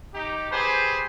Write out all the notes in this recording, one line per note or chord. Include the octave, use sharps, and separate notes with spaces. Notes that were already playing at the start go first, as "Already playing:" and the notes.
D#4 G4
G4 G#4 B4 C5